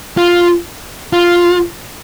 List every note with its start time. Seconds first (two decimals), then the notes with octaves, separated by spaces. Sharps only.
0.17 F4
1.13 F4